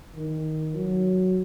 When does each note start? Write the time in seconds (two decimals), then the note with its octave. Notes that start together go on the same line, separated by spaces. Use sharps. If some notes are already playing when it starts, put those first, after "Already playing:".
0.14 D#3
0.75 F#3